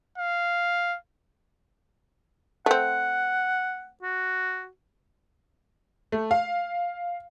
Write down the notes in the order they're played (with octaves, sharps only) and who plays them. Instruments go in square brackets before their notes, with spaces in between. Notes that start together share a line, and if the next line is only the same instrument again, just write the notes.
[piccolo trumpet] F5
[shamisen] A3 C4 [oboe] F#5
[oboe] F#4
[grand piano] A3
F5